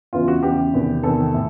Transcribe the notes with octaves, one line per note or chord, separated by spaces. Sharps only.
E2 C#3 E3 F4
F#4
E2 C#3 E3 G4
E2 C3 D#3
E2 C3 D#3 A4
A2